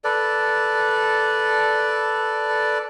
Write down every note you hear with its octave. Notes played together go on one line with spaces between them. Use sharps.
A4 B4 D5